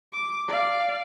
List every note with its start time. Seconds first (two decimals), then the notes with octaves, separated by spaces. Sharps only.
0.13 D6
0.48 D5 F5